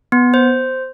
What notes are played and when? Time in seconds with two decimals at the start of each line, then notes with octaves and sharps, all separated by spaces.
0.12 B3
0.34 C5